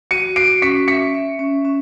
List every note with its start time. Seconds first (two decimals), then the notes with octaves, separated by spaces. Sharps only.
0.11 F#4 C#7 D#7
0.36 F#4 C7 D7
0.62 C#4 B6 C#7
0.88 E5 B6 C#7
1.14 E5
1.39 C#4
1.65 C#4